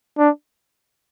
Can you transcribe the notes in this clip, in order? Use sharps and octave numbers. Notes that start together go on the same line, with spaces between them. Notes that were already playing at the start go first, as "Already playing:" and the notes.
D4